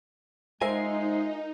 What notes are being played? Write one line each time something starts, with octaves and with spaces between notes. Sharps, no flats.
G#3 D#4 F4 A#4 C5 E5 G#5 C7